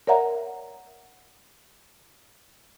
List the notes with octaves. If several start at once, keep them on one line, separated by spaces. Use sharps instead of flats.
A#4 C#5 D5 E5 F#5 A#5